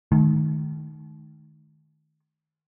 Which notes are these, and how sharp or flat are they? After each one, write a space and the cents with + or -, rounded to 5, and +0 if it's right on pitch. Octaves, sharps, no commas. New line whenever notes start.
D#3 -15 A3 -45